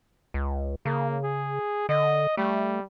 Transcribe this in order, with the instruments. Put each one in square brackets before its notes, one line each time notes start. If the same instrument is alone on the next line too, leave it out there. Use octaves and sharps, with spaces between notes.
[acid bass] C#2
[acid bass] C#3 [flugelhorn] A#3
[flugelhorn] G#4
[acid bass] D3 [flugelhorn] D#5
[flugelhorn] G3 [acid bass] A3